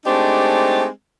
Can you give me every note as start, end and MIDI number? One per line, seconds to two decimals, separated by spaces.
0.05 0.86 56
0.05 0.86 57
0.05 0.86 60
0.05 0.86 62
0.05 0.86 63
0.05 0.86 67